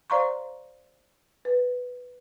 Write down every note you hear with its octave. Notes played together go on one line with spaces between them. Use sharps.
C5 D5 F5 A#5 C6 C#6
B4